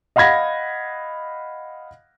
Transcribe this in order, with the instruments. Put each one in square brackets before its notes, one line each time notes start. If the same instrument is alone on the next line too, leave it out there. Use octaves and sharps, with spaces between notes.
[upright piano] D#5 F5 F#5 B5 G#6 A#6